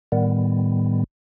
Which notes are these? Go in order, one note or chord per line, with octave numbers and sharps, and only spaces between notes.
A2 D#3 G3 B3